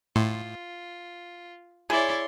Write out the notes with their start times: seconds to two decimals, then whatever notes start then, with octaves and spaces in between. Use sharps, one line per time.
0.16 A2 F4 C6
1.90 E4 G#4 C#5 D5 C6